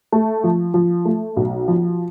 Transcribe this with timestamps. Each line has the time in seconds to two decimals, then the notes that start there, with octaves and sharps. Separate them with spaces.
0.12 A3
0.44 F3
0.74 F3
1.05 A3
1.36 B1
1.68 F3